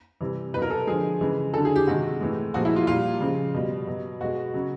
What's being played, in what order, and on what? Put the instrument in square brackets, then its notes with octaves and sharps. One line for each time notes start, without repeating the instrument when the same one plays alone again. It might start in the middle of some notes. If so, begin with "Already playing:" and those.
[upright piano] C3 E3 G3
B2 B4
F#3 A#4
A4
D3 F3 G#3 G#4
C#3 E3 G#3
D3 F#3 A4
G#4
G4
C3 D#3 G#3 F#4
A2 E3 G#3
A#2 F3 G#3 F#4
E4
F4
A#2 G3 F4
C#3 F3 G#3
B2 G3
B2 F#3
B2 G#3 F#4
C#3 F#3